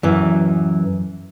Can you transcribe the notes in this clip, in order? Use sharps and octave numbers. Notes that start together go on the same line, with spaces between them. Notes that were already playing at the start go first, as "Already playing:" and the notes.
F#2 E3